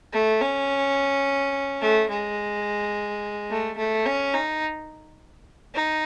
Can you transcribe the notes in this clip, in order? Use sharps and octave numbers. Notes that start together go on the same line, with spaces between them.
A3
C#4
A3
G#3
A3
A3
C#4
D#4
D#4